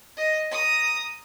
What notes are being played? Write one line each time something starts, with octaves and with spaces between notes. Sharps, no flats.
D#5
A#5 D#6